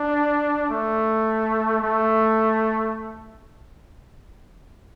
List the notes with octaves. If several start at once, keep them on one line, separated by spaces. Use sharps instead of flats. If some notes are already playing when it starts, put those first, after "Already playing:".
Already playing: D4
A3
A3